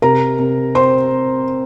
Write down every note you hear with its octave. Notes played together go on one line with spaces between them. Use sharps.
C3 A#4 A#5
C3
C4 C5 C6